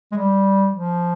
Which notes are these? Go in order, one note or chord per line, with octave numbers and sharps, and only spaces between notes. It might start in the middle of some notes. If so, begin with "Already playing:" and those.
G#3
G3
F3